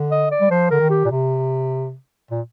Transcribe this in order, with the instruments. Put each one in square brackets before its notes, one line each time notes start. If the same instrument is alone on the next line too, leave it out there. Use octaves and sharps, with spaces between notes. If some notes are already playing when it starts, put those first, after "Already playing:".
Already playing: [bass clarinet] D3
[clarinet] D#5
D5
[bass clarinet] G3
[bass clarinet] F3 [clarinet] C5
[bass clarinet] D3 [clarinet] A#4
[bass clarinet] D#3
[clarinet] G4
[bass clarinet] A#2
C3
A#2